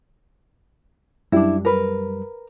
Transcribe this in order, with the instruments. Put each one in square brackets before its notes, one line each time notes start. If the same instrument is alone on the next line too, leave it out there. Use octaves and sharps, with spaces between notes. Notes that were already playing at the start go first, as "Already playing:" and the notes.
[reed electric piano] F#2 G3 [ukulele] D4 E4
[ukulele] A#4 B4